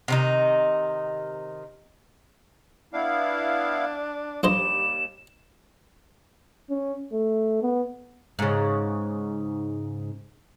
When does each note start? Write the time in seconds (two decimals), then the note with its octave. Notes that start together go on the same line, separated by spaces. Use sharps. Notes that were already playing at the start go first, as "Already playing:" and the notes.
0.08 C3 D#3 D#4
2.93 B3 D4 E4 F5
4.43 A#1 D#2 G3 C5 D#5 E7
6.70 C#4
7.12 A3
7.62 B3
8.39 G#2 C#3